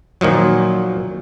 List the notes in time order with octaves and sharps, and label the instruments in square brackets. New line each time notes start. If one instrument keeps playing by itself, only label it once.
[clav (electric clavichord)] A#2 D#3 F3 F#3